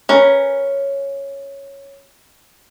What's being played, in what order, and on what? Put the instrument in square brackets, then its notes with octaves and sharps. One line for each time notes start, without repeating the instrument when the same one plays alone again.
[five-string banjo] C#4 A#4 B4